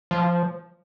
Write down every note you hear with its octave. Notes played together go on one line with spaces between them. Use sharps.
F3